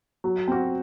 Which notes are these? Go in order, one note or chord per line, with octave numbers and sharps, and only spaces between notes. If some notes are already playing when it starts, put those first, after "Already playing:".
F#3
C4 F#4